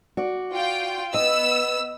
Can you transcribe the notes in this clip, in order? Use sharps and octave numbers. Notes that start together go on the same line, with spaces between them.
F#4 D5
F4 G5
B3 D#5 E6